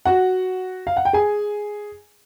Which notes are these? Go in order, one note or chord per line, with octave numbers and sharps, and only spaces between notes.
F#4 F#5
F5
F#5
G5
G#4 G#5